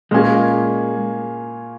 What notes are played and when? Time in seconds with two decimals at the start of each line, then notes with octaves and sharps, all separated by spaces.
0.11 A#2 G#3 A#3 C#4 G#4